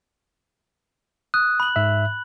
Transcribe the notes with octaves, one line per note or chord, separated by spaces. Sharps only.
D#6 F#6
B5 F#7
G#2 E5